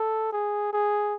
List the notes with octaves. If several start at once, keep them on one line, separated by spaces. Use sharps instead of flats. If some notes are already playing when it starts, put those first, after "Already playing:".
Already playing: A4
G#4
G#4